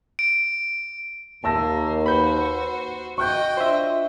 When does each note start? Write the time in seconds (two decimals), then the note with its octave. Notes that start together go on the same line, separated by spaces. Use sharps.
0.19 D7
1.44 D#2 A#3 A5 E6 A#6
2.06 F#4 B4 C5 B5 G6
3.18 F#4 D#5 G5 C#6 F#6 G6
3.57 D4 F4 C5 E5